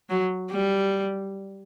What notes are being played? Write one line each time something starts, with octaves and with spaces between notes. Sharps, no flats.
F#3
G3